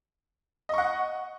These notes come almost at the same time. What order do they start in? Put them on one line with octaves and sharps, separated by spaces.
D#5 C#6 F#5